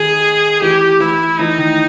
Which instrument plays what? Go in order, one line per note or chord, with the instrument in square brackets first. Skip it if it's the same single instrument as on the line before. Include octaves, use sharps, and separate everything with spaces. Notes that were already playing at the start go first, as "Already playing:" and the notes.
Already playing: [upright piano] D#3 [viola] G#4
[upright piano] E3 [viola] G4
[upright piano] E3 [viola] E4
[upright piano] E3 [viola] D#4
[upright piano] D#3